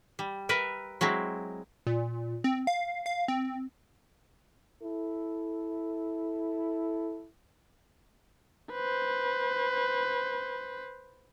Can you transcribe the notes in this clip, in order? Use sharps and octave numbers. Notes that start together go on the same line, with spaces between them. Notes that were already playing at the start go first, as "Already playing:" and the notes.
G3
A#4 B4 E5
F#3 G#3 C4 E4
A#2
C4
F5
F5
C4
E4 A4
B4 C5